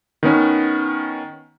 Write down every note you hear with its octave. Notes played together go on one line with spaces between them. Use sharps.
D#3 B3 C#4